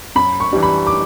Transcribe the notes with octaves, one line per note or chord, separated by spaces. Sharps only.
F#2 B5
C#6
E3 G3 D4
B5
D6